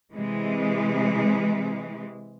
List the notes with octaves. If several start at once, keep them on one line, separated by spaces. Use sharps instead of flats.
C3 E3 G#3